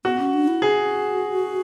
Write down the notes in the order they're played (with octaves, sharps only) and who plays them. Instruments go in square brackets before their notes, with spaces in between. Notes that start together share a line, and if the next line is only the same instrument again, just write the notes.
[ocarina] B3 [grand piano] F#4
[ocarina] C#4
D4
E4
[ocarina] F#4 [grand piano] G#4